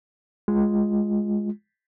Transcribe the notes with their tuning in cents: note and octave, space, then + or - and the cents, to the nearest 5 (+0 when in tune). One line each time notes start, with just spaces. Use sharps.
G#3 +0 F4 +0